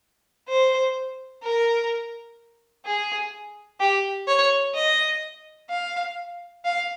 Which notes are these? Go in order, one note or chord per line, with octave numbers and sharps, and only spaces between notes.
C5
A#4
G#4
G4
C#5
D#5
F5
F5